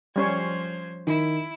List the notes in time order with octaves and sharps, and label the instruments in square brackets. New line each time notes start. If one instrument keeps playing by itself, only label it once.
[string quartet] F3 C5 G#6 [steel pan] G3 C#4 C#5
[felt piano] D#3 [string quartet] E4